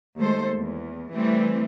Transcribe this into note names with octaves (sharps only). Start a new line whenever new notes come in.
D#2 G#3 A3 A4 C5
E2
E3 G3 A3 C4